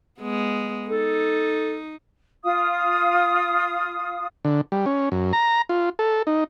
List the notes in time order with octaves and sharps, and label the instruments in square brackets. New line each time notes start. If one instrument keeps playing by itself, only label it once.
[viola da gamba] G#3 B3
[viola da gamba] D#4 [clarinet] A4
[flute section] F4 F5 D#6
[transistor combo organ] D3
G3
C#4
F#2
A#5
F4
A4
D#4